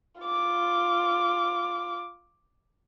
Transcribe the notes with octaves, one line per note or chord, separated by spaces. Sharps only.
F4 D6